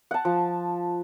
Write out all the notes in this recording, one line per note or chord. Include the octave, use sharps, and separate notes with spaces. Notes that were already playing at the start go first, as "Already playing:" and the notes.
F#5 A5
F3